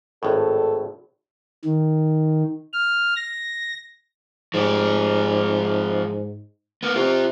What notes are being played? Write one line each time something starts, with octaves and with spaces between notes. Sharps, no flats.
G#1 A2 A4
D#3
F6
A#6
G#2 F3 G4
B3 A#4
C3 F4 G5